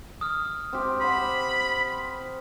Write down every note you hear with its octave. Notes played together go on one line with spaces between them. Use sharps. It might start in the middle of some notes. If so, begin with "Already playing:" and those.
D#6 F6
C4 G4
C5 F#5 B5